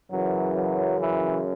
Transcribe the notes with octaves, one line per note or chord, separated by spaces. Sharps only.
F#2 C#3 E3 F#3
F#3
E3